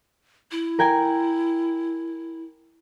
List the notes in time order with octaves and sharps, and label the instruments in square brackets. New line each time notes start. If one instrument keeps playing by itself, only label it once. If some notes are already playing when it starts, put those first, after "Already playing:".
[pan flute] E4
[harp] A#4 G5 G#5